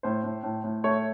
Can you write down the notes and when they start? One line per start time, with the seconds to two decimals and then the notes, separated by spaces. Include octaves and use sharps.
0.03 A2 C5
0.24 A2
0.43 A2
0.64 A2
0.84 A3 C#5